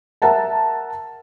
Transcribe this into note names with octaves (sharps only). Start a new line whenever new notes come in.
A#4 E5 F#5 A5 A#5